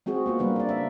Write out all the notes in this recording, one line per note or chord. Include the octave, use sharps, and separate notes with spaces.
G#3 C4 F#4 G#4
A#3 B3 F4
C#3 G3 A#3 D4 B4
D4 D5
E5